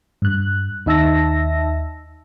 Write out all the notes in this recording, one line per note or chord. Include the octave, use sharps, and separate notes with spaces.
G2 F#6
D#2 D#4 E5 A5 E6 A#6